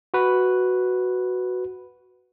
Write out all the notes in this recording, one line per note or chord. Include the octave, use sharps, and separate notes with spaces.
F#4 B4